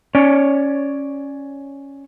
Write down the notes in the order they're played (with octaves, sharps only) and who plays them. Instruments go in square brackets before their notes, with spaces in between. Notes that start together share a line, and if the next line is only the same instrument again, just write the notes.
[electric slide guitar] C#4 C#5 D5